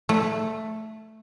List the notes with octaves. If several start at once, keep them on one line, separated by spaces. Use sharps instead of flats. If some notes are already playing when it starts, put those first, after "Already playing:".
A3